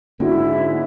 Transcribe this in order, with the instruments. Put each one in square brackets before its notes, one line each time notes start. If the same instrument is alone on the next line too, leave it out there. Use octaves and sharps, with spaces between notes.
[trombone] G#2 [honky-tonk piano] D3 F#4 [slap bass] A#3 C#4 [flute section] E4